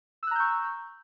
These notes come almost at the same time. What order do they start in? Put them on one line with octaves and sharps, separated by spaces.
E6 F#6 A#5 G6 C#6